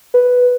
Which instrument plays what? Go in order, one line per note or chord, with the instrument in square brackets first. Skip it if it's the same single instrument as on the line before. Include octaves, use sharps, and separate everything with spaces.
[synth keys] B4